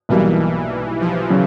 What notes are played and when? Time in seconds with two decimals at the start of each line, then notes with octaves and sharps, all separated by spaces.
0.09 B1 B2 E3 G3 A#3
1.00 F3
1.30 C#3 F#3